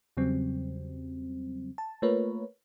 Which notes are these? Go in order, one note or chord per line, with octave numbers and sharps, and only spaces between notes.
E2 C#3 F#3 G3 C4
A5
A3 A#3 F4 A#4 B4 C#5